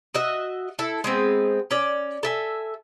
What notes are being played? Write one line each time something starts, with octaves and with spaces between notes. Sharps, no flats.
F#4 D#5 E5
E4 A4
G#3 B3 C4
C#4 D5
A4 E5 G#5